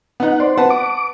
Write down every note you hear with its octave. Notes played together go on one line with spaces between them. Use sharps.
B3 D#4 F#5
C5 D5
B4 F#5 A5
D6